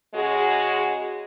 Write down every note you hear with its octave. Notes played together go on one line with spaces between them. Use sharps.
C#3 G#3 F#4 G#4